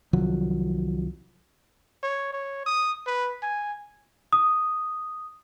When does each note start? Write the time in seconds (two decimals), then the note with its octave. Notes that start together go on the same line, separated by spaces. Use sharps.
0.13 C2 D#3 F3 F#3
2.03 C#5
2.33 C#5
2.66 D#6
3.07 B4
3.42 G#5
4.33 D#6